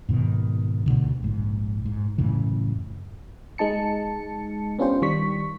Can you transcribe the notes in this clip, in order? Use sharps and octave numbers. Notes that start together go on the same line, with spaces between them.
G#2 B2 D#3
D2 B2 D3 D#3
A#1 G#2
G#2
F#2 A2 C#3 E3
G#3 D#4 A5 C#7
B3 C#4 D4 F4 G4 C5
D#3 G3 C#6 B6